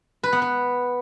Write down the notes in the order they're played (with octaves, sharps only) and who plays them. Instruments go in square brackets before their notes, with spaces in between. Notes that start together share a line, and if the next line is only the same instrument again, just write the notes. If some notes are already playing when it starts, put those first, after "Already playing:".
[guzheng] B4
B3
B4